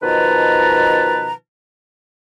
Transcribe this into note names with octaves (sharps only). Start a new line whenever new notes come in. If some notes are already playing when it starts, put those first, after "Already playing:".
B2 D#3 F3 B4 A5 A#5